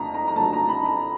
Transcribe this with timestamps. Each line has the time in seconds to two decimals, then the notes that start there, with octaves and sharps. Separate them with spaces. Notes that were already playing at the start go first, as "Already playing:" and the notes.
Already playing: F2 D3 F#3 A3 A#5
0.14 A#5
0.28 A#5
0.36 F2 D3 F#3 A3 A5
0.53 A#5
0.69 B5
0.86 A#5